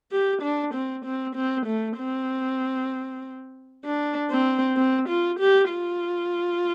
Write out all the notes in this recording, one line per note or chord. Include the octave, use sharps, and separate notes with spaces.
G4
D4
C4
C4
C4
A3
C4
D4
C4
C4
F4
G4
F4